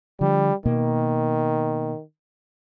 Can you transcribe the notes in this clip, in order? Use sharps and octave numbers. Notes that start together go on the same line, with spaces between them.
D3 F3 G3
B2 D#3 A#3